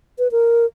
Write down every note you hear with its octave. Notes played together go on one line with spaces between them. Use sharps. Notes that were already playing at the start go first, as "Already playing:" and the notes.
B4
A#4